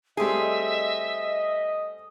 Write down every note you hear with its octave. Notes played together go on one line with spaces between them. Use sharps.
G3 A3 C4 G#4 D#5 E5